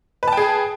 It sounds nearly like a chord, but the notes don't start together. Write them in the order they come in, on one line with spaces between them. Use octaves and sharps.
B4 A5 G5 G#4